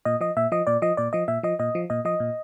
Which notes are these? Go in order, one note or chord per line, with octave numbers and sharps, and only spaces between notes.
A#2 D#5
F3 D#5
A#2 E5
F3 D#5
A#2 D5
F3 D#5
A#2 D5
F3 D#5
A#2 E5
F3 D#5
A#2 D#5
F3
A#2 D#5
F3 D#5
A#2